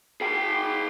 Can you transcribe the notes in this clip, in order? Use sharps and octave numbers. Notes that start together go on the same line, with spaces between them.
G#4 G5